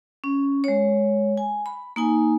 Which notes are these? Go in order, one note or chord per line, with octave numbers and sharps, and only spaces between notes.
C#4
G#3 C#5
G#5
B5
A#3 D#4 G#5